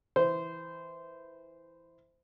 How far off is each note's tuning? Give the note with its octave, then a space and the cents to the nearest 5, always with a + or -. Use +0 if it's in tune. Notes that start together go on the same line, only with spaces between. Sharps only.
E3 +0 C5 -15